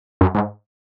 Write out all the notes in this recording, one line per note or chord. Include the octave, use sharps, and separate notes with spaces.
F#2
G#2